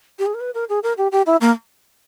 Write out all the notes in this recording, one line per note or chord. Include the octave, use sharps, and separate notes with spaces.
G4
G#4
A#4
B4
A#4
G#4
A#4
G4
G4
E4
A#3